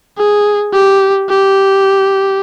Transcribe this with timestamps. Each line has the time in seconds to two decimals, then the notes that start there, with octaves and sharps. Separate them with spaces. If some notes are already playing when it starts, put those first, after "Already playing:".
0.18 G#4
0.73 G4
1.29 G4